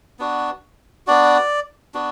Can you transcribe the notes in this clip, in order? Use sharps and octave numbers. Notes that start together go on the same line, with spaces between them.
B3 D4 F#4
B3 D4 F#4 D5
B3 D4 F#4